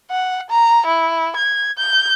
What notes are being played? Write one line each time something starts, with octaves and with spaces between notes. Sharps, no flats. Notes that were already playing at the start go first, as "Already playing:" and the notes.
F#5
A#5
E4
G#6
G6